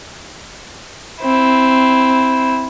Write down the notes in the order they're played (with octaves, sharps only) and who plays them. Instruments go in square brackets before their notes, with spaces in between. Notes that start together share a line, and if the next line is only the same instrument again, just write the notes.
[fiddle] C4 E4